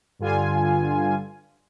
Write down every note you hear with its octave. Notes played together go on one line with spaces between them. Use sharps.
G2 D3 F4 G#5